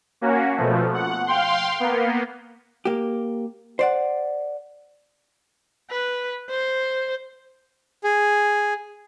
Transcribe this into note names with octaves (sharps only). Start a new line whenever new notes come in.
A#3 C#4 F#4
B2 F3 A3
F#5
F5 G5 C6
A#3 B3
A#3 G4
C5 D5 F#5
B4
C5
G#4